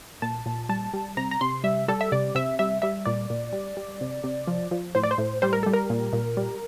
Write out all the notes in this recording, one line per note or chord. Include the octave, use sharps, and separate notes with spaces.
A#2 A5
A#2
G3 A5
G3
C3 A#5
A#5
C3 C6
G3 E5
G3 A4
E5
C3 D5
C3 E5
G3 E5
G3 E5
A#2 D5
A#2
G3
G3
C3
C3
F3
F3
A2 C5
D5
C5
A2
G3 C5
A#4
G3 A4
A#4
A#2
A#2
G3